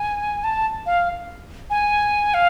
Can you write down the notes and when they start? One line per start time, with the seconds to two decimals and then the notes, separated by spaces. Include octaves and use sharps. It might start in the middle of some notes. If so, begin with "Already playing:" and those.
Already playing: G#5
0.44 A5
0.86 F5
1.70 G#5
2.34 F5